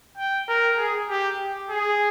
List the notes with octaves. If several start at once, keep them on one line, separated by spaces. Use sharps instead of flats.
G5
A#4
G#4
G4
G#4